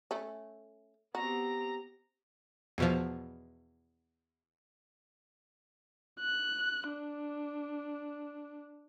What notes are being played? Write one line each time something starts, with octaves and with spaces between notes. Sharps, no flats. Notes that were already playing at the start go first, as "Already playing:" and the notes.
A3 C#4
B3 C4 F#4 G4 A#5
E2 B2 F3
F#6
D4